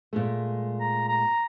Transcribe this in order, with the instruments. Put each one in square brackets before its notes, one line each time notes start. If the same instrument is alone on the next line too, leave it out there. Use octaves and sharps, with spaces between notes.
[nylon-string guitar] A#2 G#3 A3
[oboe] A#5
A#5